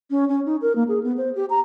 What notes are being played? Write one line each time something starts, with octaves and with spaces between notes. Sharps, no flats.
C#4
C#4
D#4
A#4
A#3
G#4
B3
C5
G4
A#5